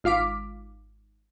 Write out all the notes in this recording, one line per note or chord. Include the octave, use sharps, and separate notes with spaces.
G#1 F4 F5 D6 B6